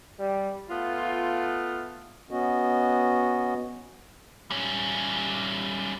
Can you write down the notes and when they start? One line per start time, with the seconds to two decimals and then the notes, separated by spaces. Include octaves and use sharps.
0.20 G3
0.69 A3 B3 F4
2.31 B3 C#4 F#4 D#5
4.51 G3 C#4